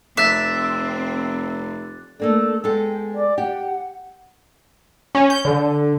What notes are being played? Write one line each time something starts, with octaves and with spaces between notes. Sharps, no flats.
F1 C4 E5 D6 F#6 A6
A3 A#3 D4 A4
G#3 B3 A4 G5
D5
G4 F#5
C#4
G6
D3